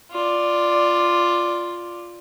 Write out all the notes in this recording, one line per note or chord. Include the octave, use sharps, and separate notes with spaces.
F4 D5